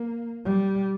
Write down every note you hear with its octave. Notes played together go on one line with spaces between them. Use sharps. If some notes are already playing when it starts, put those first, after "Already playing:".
Already playing: A#3
G3